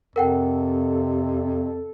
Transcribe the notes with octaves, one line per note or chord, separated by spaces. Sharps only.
F2 C3 A4 A#4 F#5 G5